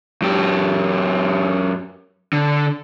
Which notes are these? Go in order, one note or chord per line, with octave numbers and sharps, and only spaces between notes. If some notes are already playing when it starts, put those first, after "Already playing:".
F#2 G4
D3